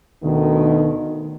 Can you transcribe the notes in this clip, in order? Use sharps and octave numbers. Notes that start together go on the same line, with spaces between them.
D2 B2 D#3